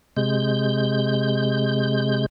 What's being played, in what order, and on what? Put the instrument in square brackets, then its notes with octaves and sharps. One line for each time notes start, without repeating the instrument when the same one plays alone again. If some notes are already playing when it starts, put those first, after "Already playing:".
[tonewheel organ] C3 G#3 G6